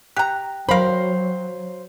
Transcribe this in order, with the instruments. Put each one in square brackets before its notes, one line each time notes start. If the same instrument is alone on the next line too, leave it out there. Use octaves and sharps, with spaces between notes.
[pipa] G4 A#5 [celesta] G5 F#6
[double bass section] F#3 [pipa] A#4 B5 [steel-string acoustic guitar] C5 F5